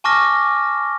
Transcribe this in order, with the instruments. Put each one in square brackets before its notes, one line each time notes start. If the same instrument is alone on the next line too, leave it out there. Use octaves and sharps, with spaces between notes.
[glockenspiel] G#5 A5 C#6 D6 F6 A#6